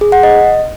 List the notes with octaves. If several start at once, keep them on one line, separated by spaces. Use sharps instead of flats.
G#4
F#5
D#5